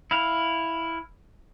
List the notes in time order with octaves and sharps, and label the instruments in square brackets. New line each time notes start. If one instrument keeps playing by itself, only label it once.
[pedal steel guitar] E4 F5